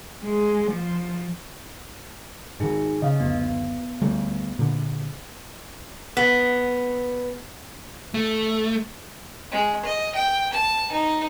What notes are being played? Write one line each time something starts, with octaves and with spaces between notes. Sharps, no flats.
G#3
F3
G#2 D#3 D#4 G#4
C#3 D#5 F5
F#1 D2 B3
D2 G3 A3
A#2 D3
B3
A3
G#3
D#5
G5
A5
D#4